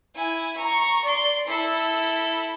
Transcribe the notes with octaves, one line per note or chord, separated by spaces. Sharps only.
E4 G#5
A#5 C#6
D5 C6
E4 A4